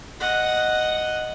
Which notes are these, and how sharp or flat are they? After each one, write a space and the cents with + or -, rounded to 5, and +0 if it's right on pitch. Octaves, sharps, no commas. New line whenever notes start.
D#5 +0 F#5 +0